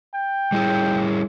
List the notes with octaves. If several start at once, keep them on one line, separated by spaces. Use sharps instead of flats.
G5
G3 E4 G#4